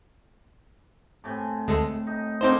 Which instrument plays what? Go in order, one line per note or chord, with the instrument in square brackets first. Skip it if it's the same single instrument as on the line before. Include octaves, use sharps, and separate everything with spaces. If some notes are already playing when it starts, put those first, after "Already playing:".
[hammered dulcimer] A2 C3 G#5
[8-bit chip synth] D2 G#3 A4
[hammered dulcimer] D#4
[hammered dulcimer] D3 A#3 [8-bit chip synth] C4 D#4 C5